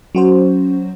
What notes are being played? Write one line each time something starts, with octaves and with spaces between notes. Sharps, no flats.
F#3 C#4 F#4 C5